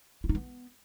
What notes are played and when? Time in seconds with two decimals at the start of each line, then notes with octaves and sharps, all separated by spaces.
0.24 E4
0.29 D#4
0.35 B3